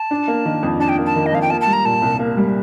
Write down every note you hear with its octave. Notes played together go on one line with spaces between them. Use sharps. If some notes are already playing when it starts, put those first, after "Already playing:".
Already playing: A5
D4
A#3
D#3
F2
D4 A5
G5
A#3
A5
D#3
D#5
F2 F5
G5
A#3 A5
A5
G3
A#5
A#2 A5
C2
A#3
G3